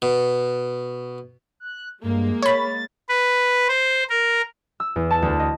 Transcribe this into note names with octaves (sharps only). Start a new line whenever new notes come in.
B2
F#6
G2 G#3 A#3
C#5 B5 A6
B4
C5
A#4
E6
E2
A5
D2
D#5